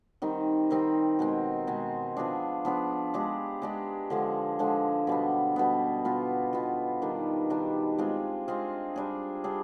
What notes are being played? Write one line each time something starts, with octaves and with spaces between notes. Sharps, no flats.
D#3 G3 C4 D#4
D#3 G3 C4 D#4
B2 G#3 C4
B2 G#3 C4
F3 B3 D4 G#4
F3 B3 D4 G#4
G#3 D4 G4
G#3 D4 G4
D3 F3 G#3
D3 F3 G#3
B2 G3 B3
B2 G3 B3
B2 B3 F4
B2 B3 F4
D#3 G3 D4
D#3 G3 D4
G#3 C4 F4 G#4
G#3 C4 F4 G#4
G3 D4 G#4
G3 D4 G#4